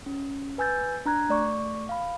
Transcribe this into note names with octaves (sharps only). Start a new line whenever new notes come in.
C#4
B4 G#5 E6 G6 A6
D4 A#5 F#6 G#6
A3 D5 C#6
F5 B5